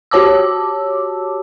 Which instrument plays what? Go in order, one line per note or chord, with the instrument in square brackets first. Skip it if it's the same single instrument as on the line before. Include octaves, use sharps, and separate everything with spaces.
[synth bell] F#4 G4 C#5 A5 D6 E6